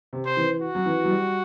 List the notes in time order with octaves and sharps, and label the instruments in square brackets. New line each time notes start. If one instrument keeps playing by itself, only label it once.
[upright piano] C3
[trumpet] C5
[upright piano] E3
[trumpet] F#4
[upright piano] F#3
E3
F#3
G3